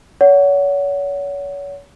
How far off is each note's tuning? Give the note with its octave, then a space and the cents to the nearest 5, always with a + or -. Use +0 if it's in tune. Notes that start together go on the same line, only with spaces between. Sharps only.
C#5 +35 F#5 +0